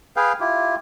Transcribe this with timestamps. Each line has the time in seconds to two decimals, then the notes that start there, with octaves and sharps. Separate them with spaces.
0.16 G#4 B4 F5 G5
0.40 E4 F4 G4